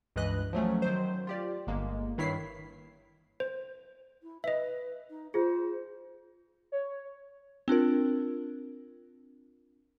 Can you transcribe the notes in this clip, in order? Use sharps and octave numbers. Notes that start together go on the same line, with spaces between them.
C#2 G2 E3 B4 D#5 F#6
F3 F#3 A3 C#4
D#3 F#3 C5
F4 G4 D5
G1 G#3 A#3
G2 D#3 E4 C#5 B6 C7
C5
E4
B4 D#5 E5
D#4
F4 G#4 C5
C#5
C4 D4 F4 A#4